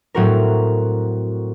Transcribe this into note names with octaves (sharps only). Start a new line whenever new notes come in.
A2 F#3 C4 F#4 A#4